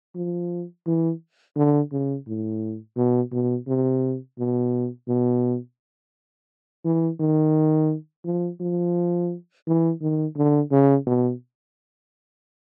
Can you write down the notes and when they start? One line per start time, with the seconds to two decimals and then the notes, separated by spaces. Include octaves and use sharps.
0.15 F3
0.86 E3
1.56 D3
1.92 C#3
2.28 A2
2.97 B2
3.32 B2
3.67 C3
4.39 B2
5.08 B2
6.85 E3
7.20 D#3
8.25 F3
8.60 F3
9.67 E3
10.02 D#3
10.36 D3
10.71 C#3
11.07 B2